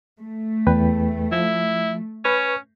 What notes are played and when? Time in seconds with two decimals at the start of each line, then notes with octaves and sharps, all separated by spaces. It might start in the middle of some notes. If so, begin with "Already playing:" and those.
0.21 A3
0.67 E2 B4 G5
1.32 F3 E4
2.25 C#4 B4 C#6